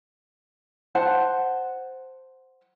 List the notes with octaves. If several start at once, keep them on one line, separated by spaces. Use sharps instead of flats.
C5 F#5 A5